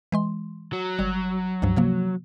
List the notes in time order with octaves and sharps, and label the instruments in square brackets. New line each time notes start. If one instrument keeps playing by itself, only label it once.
[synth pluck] E3 G#3 C6
[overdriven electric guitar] F#3
[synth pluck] G1 G3
C#2 G2 F3
C3 F3 A#3